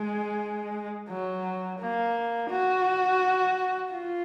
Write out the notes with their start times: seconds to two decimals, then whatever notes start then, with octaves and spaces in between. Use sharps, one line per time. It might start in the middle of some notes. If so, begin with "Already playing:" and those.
Already playing: G#3
1.08 F#3
1.80 A#3
2.50 F#4
3.92 F4